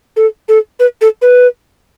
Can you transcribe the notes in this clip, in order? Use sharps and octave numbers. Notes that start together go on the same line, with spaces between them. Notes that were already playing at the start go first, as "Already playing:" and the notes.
A4
A4
B4
A4
B4